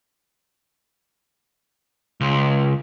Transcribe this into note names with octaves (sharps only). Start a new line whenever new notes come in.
C#2